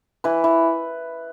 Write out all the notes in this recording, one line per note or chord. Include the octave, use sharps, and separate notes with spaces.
E3 B4
E3